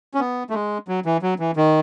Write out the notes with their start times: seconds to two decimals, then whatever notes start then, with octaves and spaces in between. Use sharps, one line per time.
0.14 C#4
0.20 B3
0.50 A3
0.54 G#3
0.88 F#3
1.05 E3
1.22 F#3
1.39 E3
1.56 D#3